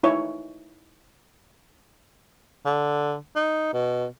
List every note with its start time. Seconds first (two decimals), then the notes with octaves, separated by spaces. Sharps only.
0.03 D#4 E4 C#5
2.65 D3
3.35 D#4
3.73 B2